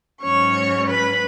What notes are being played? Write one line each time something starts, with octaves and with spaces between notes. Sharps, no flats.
G#2 F#3 C#4 C#5 C#6
B4 B5